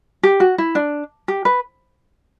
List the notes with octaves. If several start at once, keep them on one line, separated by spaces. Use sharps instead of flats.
G4
F#4
E4
D4
G4
B4